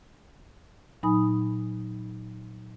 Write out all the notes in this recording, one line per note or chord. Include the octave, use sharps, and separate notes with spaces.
A#2 F#3 D#4 G#5 B5 D#6